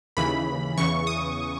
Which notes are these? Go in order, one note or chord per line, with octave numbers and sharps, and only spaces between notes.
D#2 C#3 E3 B5
E2 C#3 E3 C#6
D#6